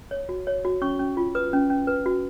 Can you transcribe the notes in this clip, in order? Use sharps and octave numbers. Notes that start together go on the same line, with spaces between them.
C#5
F#4
C#5
F#4
C#4 C#6
C#4
F4
B4 D#6
C#4
C#4
B4
F#4